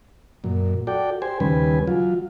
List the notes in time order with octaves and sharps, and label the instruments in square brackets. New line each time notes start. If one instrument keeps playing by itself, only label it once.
[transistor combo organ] F#2 A#2
F#4 A4 D5 G5
G4 C5 G#5
D#2 C#3 G3 B4 G#5
F#3 F4